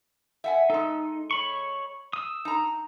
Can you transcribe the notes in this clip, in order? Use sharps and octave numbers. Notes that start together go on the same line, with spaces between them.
E5 F#5 G#5
G#3 D#4 A4
C#5 B5 C#6
D#6 E6
D#4 A#5